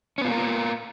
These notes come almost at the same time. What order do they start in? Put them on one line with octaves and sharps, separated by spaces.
C#4 B3 F4 A#3 A#4